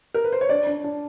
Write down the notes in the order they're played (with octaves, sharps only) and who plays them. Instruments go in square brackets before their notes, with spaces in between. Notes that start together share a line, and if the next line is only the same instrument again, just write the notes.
[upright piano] A#4
B4
C5
C#5
[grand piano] D4 [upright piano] D5
[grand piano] D4
D4